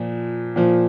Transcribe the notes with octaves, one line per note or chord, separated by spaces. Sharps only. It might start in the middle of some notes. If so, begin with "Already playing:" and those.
Already playing: A#2 F3
A#2 F3